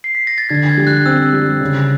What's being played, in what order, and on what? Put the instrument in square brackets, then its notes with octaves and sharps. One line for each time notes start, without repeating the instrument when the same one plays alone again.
[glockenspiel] C7
B6
A#6
A6
[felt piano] D3 [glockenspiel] G#6
[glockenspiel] G#6
[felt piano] G3
[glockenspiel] F#6
[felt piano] C4 [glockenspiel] E6
[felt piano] G3
C#3